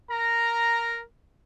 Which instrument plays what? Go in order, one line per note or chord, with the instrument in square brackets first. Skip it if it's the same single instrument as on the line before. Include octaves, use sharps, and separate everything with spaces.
[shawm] A#4 [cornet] A#5